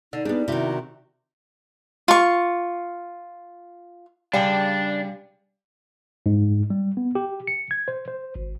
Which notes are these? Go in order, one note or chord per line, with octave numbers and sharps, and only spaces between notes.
D3 D#4
G3 B3 D4 G#4
C3 D#3 E4 F#4 E5
F4 C#6
C#3 G3 D4 D5 F5 G5 G#5
G#2
G3
B3
G4
C#7
G#6
C5
C5
G#1